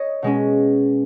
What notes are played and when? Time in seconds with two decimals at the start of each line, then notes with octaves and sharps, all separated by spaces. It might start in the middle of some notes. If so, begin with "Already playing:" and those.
Already playing: C#5 D#5
0.22 B2 G#3 C#4